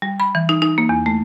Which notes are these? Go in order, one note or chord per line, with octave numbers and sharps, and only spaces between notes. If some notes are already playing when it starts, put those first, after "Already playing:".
G3
B5
E3
D#4
D#4
A#3
E2
A3